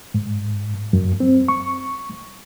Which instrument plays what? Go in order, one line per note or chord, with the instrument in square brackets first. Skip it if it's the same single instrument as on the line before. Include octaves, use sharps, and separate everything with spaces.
[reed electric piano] G#2
F#2
C4
C#6